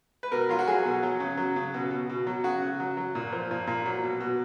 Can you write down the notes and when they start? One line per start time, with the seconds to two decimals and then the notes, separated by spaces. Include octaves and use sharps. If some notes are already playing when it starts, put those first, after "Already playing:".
0.23 B4
0.32 B2 A#4
0.49 F#3 F4
0.59 F#4
0.67 F#3 G#4
0.85 B2
1.03 F#3
1.20 C#3
1.37 F#3
1.56 C#3
1.74 B2
1.91 B2
2.09 B2
2.27 F#3
2.44 C#3 F#4
2.62 C#3
2.80 F#3
2.97 F#3
3.15 A#2
3.32 F3
3.51 A#2
3.67 A#2
3.86 F#3
4.03 B2
4.20 B2